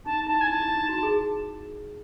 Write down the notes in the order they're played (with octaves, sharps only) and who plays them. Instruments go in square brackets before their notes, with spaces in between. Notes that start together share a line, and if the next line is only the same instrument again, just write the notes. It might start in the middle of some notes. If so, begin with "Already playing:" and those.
[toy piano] D#4 [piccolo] A5
[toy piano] D#4
[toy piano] E4 [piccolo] A5
[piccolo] G#5
[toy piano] E4 [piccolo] A5
[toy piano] E4
D#4
F#4
G#4